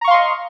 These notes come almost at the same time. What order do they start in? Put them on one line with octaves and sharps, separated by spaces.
A#5 C#6 F5 C6 D#5